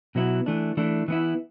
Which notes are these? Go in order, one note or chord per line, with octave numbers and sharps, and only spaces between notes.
B2 F#3 B3 E4
E3 A3 D4
E3 A3 D4
E3 B3 E4